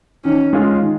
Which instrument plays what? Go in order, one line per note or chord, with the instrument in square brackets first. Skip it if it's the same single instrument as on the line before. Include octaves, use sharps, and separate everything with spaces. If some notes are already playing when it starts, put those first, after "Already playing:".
[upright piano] D#3 [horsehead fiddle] C#4
[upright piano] G#3 C#4 F4 G#4
D#3